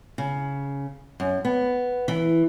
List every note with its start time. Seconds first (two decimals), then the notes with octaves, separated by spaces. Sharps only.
0.18 C#3
1.20 F#2
1.45 B3
2.08 E3